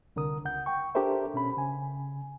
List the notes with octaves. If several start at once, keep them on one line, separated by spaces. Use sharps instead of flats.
C2 D3 A#4 D#6
C#2 F#5 G6
G5 C#6
D4 G4 A4 A#4 C5 E5
B2 C#4 B5
C#3 G#5